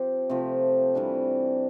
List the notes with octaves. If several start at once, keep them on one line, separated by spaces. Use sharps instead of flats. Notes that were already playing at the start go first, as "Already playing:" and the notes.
Already playing: F3 C4 G4
C3 F3 A3
C3 E3 G3 D4